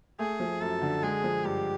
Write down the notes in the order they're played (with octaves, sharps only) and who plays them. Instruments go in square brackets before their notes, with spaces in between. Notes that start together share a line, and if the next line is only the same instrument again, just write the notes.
[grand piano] A3 [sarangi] G#4
[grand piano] F3
[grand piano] F#2 [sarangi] A4
[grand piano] D3
[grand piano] G#3 [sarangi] G#4
[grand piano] F3
[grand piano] G2 [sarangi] G4